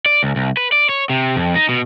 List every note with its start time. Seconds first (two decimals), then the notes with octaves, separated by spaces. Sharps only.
0.06 D5
0.23 C#2
0.36 C2
0.57 B4
0.72 D5
0.89 C#5
1.10 C3
1.36 F2
1.56 D#4
1.69 B2